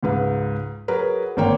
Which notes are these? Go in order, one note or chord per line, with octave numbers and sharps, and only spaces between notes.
C#2 G#2 B4
F#3 G#4 A#4 B4
G#1 D3 A#3 C#5 G5